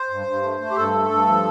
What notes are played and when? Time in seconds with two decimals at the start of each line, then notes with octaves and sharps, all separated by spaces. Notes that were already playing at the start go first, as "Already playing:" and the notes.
Already playing: C5
0.10 G2
0.27 G2
0.43 A3
0.60 A3
0.70 G4
0.76 G2 A4
0.93 A3
1.11 G2
1.28 F3